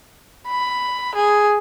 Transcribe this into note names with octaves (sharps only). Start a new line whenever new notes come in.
B5
G#4